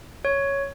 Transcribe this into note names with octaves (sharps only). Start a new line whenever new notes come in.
C#5